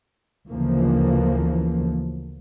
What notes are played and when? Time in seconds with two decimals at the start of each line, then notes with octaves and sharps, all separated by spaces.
0.48 D2 C#3 E3 F3 A#3